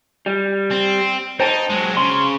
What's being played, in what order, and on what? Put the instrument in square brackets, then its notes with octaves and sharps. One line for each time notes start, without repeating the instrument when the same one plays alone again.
[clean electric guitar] G3
[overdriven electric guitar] C4
[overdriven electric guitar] D#4 [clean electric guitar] C5 G5 A5
[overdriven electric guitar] F#3 G#3
[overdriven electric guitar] C#3 [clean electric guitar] C6